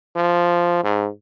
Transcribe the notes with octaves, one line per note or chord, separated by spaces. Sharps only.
F3
G#2